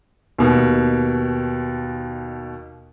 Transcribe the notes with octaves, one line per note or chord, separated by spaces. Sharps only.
D#2 B2